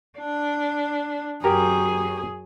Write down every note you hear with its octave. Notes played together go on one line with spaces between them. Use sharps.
D4
F#2 G4 G#4 A#4 A#5